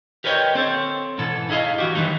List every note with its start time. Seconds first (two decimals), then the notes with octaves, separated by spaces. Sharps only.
0.24 G4 A#4 B4 C#5 D#5 G5
0.55 C4 A4 C#5
1.18 G#2 B2 E3 A4
1.49 D#4 E4 G#4 D#5 F5
1.78 E3 F#4 G4
1.95 D#3 E3 F#3 G#3 D#4